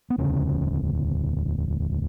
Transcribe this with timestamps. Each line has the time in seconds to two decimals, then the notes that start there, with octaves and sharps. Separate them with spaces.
0.10 B3
0.18 E1 D2 C#3 C#4